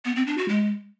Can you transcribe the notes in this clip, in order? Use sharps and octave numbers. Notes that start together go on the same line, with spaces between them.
B3
C4
D4
F#4
G#3